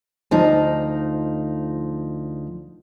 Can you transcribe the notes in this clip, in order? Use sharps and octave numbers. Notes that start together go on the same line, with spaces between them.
D2 F3 D#4